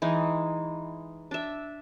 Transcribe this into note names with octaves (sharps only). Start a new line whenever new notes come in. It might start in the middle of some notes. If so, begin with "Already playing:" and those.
E3 G#3 D#4
D4 E5